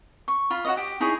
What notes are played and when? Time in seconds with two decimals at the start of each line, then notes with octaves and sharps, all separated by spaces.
0.28 C#6
0.50 F4 B5
0.65 F#4 C#5 D#5
0.77 G4
1.00 D#4 E4 G#4 C#5